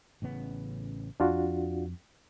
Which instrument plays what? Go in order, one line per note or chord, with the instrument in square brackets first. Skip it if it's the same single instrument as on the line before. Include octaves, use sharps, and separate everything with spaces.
[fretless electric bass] A1 C#3 B3
[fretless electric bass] F2 [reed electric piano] D4 F4 F#4